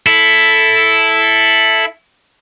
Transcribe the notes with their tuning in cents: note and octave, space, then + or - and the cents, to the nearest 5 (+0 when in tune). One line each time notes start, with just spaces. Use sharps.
E4 +0 A4 +0